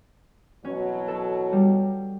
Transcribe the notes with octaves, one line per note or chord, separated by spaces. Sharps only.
B2 E3 F#3 C#4
A4
G3